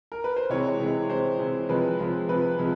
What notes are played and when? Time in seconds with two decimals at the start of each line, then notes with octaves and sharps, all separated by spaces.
0.12 A#4
0.24 B4
0.36 C5
0.50 C3 E3 G#3 C#5
0.79 C3 E3 G#3
1.10 C3 E3 G#3 C5
1.39 C3 E3 G#3
1.69 C3 F3 G#3 B4
1.99 C3 F3 G#3
2.28 C3 F3 G#3 B4
2.58 C3 F3 G#3